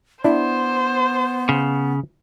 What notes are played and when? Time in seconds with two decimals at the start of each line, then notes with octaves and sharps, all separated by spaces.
0.24 B3 D4 E4 C5
1.49 C#3